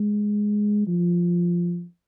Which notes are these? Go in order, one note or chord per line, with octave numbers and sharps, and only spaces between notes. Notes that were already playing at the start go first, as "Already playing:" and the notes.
Already playing: G#3
F3